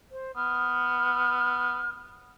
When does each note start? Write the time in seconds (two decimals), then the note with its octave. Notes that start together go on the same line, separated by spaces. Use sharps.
0.12 C5
0.36 B3 F6